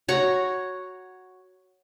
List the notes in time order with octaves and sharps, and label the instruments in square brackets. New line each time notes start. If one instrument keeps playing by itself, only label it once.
[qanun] F#4 C#5 A#5 C#6